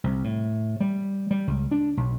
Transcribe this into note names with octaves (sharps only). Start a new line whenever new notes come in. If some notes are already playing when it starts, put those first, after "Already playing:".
C2
A2
G3
G3
C#2
D4
B1